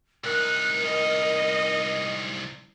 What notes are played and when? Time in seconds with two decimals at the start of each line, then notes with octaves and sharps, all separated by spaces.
0.24 C2 D#4 A#4 F#6
0.84 D#5